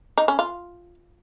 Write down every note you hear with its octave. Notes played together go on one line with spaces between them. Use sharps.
D#4
C#4
F4